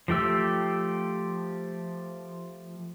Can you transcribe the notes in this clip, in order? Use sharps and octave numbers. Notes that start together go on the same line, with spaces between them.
F3 A3 G4 E6